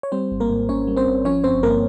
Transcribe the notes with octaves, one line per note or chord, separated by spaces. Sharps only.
C#5
G3 C4 C5
G#1
A#3 A#4
G#2
G#1 C#4 C#5
G3
C4 C5
G#1
F3 C#4 C#5
G1 C4 C5
G2 A#3 A#4